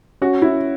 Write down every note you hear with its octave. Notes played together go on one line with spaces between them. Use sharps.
C#4 F#4
E4